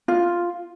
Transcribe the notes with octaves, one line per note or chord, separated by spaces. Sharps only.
F4